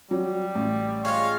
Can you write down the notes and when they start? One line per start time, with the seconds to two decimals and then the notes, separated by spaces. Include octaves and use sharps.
0.11 F#3 G3
0.55 A1
1.05 G#3 F4 C#5 F5